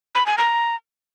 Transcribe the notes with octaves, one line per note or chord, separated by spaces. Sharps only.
B5
G#5
A#5